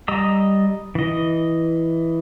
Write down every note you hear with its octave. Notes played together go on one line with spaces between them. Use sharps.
G3 D#5 A#5 D#6 E6
E3 D#5